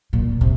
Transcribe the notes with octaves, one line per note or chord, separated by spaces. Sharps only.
A#2
C3